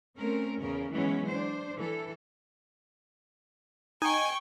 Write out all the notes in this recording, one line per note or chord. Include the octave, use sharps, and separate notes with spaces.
A3 C4 C#4 A#4
E2 C#3 A#4
E3 F#3 G#3 B3 C#4
D4 C5
E3 A4
D#4 G5 G#5 C#6